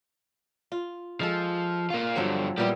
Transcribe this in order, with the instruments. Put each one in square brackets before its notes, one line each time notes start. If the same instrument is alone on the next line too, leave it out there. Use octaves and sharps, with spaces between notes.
[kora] F4
[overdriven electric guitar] F3 [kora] G#3 A4
[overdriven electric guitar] A#3 F4
[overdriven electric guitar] G2 D3 [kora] F3 F#3 C4
[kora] A#2 B3 E4 [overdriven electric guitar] G3 G4